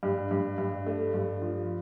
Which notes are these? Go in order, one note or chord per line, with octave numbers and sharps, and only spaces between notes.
G2
G2
G2
A3
G2
F3